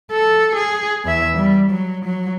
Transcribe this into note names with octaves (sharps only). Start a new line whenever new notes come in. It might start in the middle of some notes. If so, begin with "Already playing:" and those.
A4
G#4
E2 E5
G3
F#3
F#3